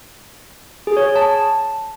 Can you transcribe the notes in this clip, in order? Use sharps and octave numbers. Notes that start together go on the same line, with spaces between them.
G#4
C#5
G#4
A5